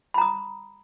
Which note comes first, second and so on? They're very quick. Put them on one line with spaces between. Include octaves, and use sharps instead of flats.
B5 A#5 D#6